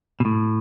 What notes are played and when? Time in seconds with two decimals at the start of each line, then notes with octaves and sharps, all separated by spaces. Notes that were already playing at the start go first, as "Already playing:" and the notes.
0.20 B2
0.25 A2